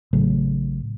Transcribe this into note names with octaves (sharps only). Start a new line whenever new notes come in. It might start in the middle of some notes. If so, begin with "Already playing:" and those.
A1 C#3 F#3 A3